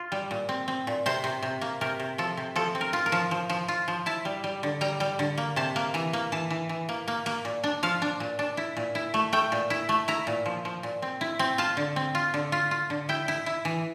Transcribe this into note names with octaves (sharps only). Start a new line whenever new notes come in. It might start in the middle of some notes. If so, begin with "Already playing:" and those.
Already playing: F4
G3
A#2
C4
C4
A#2
C3 C5
C3
C3
A#3
C3 A#4
C3
F3 A4
C3
F3 A4
C4
A#4
F4
A#4
F3
F3
F3
F4
F3
E4 A5
G3
G3
D3
G3 A#5
G3
D3
A#3
C3 A5
A#3
E3 A#5
A#3
E3 A5
E3
E3
A#3
A#3
A#3
A#2
D4
F3 F5
D4
A#2
D4
E4
A#2
E4
A3
A3 G5
A#2
E4
A3
E4 A#5
A#2
F3
F3
A#2
C4
E4
C4
F4 A5
D3
C4
F4
D3
F4
F4
D3
E4 G5
E4
E4
E3